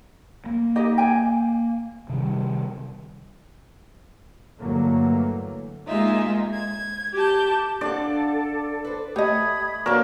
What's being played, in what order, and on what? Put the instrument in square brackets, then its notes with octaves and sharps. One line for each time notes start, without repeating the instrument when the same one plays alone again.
[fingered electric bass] A#3
[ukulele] D#4 G4 D#5
G5 G#5
[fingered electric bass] C3 D#3 G3
[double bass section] G2 D3 E3 F#3 A3 A#3
[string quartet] G#3 A#3 D#4 F4 E5
G#6
G4 A5 G6
[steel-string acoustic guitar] D4 F5 F#5 [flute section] A4 [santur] D5
[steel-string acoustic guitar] B4 C5
[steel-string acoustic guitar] A3 [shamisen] G4 D#5 [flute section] B5 D#6 G#6
[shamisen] F#3 D4 [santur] A#3 A#4 [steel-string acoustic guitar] B3 D5